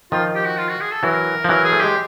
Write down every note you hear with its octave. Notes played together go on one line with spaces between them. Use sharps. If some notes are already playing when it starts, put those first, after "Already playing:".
D#3 F3 F4
G4
F#4
F4
F#4
G#4
A4
E3 F#3 A#4
F3
E3 F#3 A#4
G#4
A3
G#3 G4